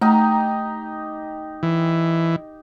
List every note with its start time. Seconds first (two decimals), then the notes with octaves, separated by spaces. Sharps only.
0.01 A3 D#4 G4 A#5
1.63 E3